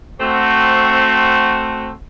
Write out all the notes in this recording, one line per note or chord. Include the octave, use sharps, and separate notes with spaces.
A3 C4 F#4